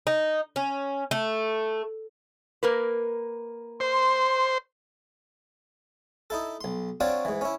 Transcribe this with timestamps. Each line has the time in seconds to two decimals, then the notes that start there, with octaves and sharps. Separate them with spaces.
0.07 D#4
0.56 C#4
1.11 A3
2.63 A#3 A#4 B4
3.80 C5 C6
6.30 D#4 E4 A4
6.61 B1 C6
7.00 C4 D4 F4 F#4 C#5 D5
7.25 G#2 E3
7.41 C#4 E4